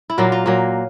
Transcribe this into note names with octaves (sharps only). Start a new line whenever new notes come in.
E4
A#2 F#3 A#3 F4
F4
A#2 F#3 A#3